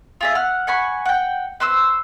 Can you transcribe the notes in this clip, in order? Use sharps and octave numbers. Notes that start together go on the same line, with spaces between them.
F4 G#4 E5
F#5 F6
F#5 G#5 B5 C#6
F#5 G5
B4 C5 C6 E6